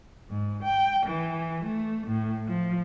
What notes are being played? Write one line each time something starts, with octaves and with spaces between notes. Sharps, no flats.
G#2
G5
E3
A3
A2
F3